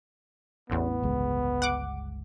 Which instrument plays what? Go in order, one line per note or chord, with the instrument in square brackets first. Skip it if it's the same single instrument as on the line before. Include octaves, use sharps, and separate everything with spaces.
[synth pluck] A1 E2 [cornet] B3
[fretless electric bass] G1 C#2 G#3
[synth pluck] F#5 D6